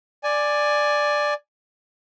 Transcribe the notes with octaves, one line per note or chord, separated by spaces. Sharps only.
D5 G#5